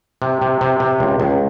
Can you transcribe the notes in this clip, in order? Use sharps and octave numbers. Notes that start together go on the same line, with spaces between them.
C3
C3
C3
C3
C#2
C#2